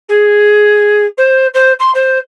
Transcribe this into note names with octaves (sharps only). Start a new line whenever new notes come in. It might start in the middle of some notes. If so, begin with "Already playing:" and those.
G#4
C5
C5
C6
C5